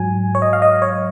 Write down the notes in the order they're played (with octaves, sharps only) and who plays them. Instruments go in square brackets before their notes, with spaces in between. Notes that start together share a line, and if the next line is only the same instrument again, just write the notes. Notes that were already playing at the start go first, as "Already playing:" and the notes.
Already playing: [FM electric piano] G#2 F#3 G#5
C#5
D#5
F5
D#5
C#5